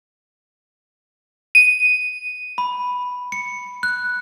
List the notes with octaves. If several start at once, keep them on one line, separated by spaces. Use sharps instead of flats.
D#7
B5
C#7
F#6